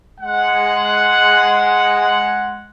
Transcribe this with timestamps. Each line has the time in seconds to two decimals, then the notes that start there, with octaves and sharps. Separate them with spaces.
0.20 G#3 F#5